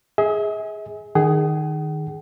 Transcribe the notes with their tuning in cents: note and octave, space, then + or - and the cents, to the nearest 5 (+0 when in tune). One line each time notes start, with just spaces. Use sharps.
G#4 +0 E5 -45
D#3 -10 G#4 +0 F#5 +45